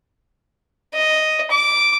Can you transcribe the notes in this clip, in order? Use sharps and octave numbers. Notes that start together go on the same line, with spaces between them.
D#5
D6